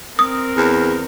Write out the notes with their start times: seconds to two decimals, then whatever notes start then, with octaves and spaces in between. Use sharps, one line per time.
0.19 C4 A#4 D#6
0.57 E2